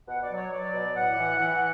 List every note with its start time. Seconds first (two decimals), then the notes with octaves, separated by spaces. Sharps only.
0.08 B2 F#5
0.22 D5
0.29 F#3
0.37 C#5
0.52 F#3 D5
0.74 B2
0.95 A2 F#5
1.17 E3
1.38 E3